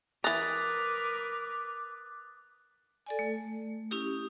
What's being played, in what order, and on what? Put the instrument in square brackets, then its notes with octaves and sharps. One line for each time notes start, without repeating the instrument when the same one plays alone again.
[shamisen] E3 A#5 [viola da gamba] A#4 B4 [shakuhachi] D6 [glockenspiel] D#6 F#6 A6
[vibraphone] A4 D5 G#5
A3
C#4 E4 G4 D#6